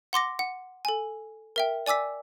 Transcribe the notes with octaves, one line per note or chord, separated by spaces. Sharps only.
F#5 C6 D6 A#6
F#5
A4 G#5
A#4 E5 G5
D5 G#5 D6 E6 B6